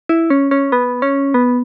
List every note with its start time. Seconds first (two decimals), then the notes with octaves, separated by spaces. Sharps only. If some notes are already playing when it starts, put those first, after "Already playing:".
0.09 E4
0.30 C#4
0.51 C#4
0.72 B3
1.02 C#4
1.34 B3